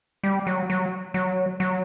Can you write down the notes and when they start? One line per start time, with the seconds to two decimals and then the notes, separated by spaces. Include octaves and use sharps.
0.23 G3
0.47 F#3
0.70 F#3
1.14 F#3
1.60 F#3